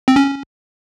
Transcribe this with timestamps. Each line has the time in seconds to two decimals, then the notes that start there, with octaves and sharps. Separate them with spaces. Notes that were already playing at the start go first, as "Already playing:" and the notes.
0.08 C4
0.16 C#4